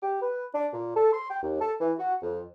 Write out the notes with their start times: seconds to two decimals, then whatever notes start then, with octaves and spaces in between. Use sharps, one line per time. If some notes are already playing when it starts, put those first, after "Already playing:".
0.03 G4
0.22 B4
0.54 D4
0.73 A#2
0.96 A4
1.13 C6
1.30 G5
1.43 D#2
1.60 A4
1.80 E3
1.99 F#4
2.22 F2